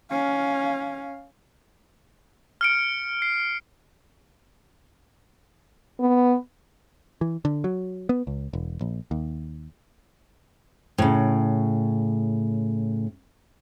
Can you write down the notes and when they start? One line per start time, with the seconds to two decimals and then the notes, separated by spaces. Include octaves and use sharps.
0.10 C#4 F5
2.61 F6 C#7 D7
3.22 C7
6.00 B3
7.21 E3
7.45 D3
7.64 F#3
8.09 B3
8.27 C#2
8.53 E1
8.81 A#1
9.11 D#2
10.98 A2 C#3